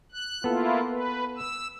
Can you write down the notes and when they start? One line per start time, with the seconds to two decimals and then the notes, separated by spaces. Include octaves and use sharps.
0.12 F#6
0.44 A#3 B3 E4 F4 A4
0.90 B4
1.36 E6